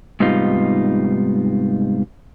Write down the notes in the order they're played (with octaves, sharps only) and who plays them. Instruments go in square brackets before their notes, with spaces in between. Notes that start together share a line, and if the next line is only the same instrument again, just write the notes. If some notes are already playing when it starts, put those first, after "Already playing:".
[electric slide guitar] G#2 C3 G3 B3 D#4 F4